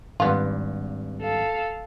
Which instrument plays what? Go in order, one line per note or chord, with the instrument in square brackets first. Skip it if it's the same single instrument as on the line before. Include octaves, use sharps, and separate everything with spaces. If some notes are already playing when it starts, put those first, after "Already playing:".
[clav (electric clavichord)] G#1 G2 [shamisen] B3 F4
[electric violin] A4 F5